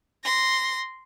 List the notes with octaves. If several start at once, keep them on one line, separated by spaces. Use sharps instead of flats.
C6 A#6